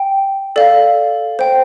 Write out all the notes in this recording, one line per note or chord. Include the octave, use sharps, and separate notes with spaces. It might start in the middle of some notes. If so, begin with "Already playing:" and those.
Already playing: G5
A4 D5 F5
C5 G5